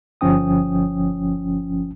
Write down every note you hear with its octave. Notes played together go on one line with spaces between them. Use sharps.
G1 F3 C#4 G5 D#6